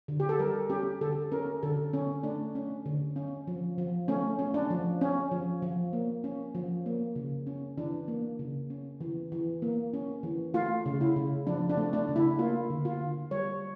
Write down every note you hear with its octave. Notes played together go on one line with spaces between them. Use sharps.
D3
G4
A4
G3 A#4
C#4 G4
D3 A4
C#4 A#4
D3 A4
D3 C#4
A3 D4
C#4
D3
C#4
F3
F3
A3 C#4
C#4
D4
F3
C#4
F3
F3
A#3
C#4
F3
A#3
C#3
C#4
E3 D4
A#3
C#3
C#4
E3
E3
A#3
C#4
E3
A3 F4
C#3
E4
C#3
F3 D4
D4
A3
D4
C#3
E4
A#3 F4
D3
F4
D3
G3 C#5